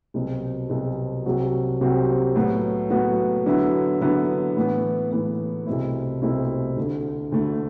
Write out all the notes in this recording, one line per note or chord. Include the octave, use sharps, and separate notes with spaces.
C2 B2 F#3 C4
C2 B2 F#3 C4
C2 C3 F#3 C4 F#4
C2 C3 F#3 C4 F#4
A2 F#3 B3 F#4
A2 F#3 B3 F#4
D3 F#3 B3 E4
D3 F#3 B3 E4
A2 E3 B3
A2 E3 B3
C2 B2 A3 C4 E4
C2 B2 A3 C4 E4
D2 D3 A3
D2 D3 A3